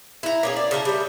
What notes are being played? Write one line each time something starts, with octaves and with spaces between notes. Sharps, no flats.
E4 A#5
A#3 C#4 G#4
D5
C#3 A#4 B4 A5
G3 A3